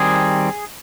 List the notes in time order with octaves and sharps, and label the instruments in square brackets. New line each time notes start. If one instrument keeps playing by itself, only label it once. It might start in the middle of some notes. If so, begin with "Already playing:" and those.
Already playing: [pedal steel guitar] D#3 G3 C4 G#4